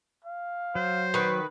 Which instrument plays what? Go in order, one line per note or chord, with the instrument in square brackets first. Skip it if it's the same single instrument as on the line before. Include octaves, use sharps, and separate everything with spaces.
[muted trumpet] F5
[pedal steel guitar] F#3 [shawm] C5
[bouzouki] D#3 B4 [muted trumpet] F#4